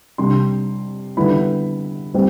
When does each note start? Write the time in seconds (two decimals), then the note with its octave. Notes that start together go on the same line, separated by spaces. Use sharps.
0.18 C3 G3 D4 C6
1.17 D3 G3 B3 E4 B5
2.14 G3 C4